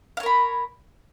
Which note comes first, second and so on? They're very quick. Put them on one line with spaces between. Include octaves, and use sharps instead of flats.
F5 C#5 A#4 B5